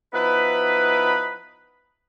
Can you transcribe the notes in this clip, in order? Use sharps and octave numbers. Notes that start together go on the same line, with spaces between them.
F3 B3 D#4 E4 B4